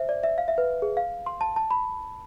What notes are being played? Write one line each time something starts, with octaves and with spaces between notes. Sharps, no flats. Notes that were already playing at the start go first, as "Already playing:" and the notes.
Already playing: C5 E5
D5
E5
F5
E5
B4
G#4
F5
C6
A5
A5
B5